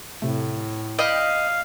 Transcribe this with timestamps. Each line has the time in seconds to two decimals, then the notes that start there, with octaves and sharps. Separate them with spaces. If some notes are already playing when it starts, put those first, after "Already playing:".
0.22 A2 C3 A3
0.99 D#5 F5 G5 B5